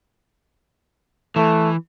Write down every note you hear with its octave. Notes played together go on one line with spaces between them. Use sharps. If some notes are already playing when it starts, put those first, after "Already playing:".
E3 A3